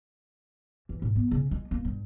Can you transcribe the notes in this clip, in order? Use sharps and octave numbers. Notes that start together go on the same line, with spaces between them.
E3
G#2
B3
C#3
G#3
A#3
G2